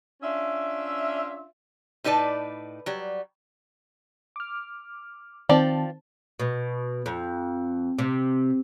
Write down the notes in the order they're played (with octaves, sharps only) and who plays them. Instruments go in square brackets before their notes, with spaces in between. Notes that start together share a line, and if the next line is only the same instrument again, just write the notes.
[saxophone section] C#4 D4 F4 E5
[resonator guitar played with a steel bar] A2 D#4 B4 D5 A5
F#3 G3
[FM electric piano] D6 F6
[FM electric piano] D#3 C4 A5 [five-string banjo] F3 D5 G5
[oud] B2
F2
C3